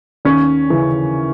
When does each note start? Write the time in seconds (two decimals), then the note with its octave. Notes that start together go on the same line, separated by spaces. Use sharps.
0.25 D#2 C#4
0.70 C#3 E3